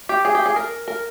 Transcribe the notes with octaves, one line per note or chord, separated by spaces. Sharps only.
G4
G#4
G4
G#4
A#4
A#4